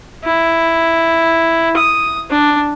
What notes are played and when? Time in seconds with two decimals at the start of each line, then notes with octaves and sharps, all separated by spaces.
0.24 E4
1.76 D#6
2.30 D4